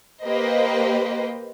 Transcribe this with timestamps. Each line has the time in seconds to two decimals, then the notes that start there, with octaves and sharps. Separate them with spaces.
0.23 A#3 G4 B4 C5 D#5